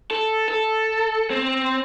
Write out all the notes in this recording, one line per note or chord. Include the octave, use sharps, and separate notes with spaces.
A4
A4
C4